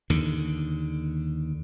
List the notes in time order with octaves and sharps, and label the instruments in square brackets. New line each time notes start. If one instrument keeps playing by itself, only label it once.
[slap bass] D#2 D3